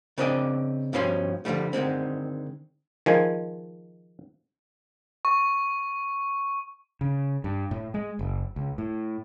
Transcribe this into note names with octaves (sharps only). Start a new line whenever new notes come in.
C#3 C4 D4 D5 D#5 G#5
G2 B2 F3 C#4 F#4 C6
D3 E3 F3 G3 A3
D3 D#3 G#3 C4
D#3 F3 G#3 G#5
C#6
C#3
G2
A2
G#3
F#1
C#2
A2